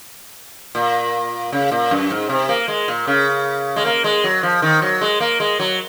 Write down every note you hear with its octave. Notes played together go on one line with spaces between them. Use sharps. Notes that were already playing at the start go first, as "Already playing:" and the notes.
A#2
C#3
A#2
F#2
G#2
C3
A#3
G#3
A#2
C#3
G#3
A#3
G#3
F#3
F3
D#3
F#3
G#3
A#3
G#3
F#3